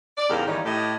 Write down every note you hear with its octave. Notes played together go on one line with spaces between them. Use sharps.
D5
E2 G#2 C#3 G4 A#4 F5
D#3 E3 G3 C#4 D#4
A2 G4 D#5